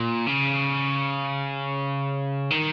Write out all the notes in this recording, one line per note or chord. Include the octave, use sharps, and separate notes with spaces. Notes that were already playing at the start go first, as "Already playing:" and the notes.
Already playing: A#2
C#3
D#3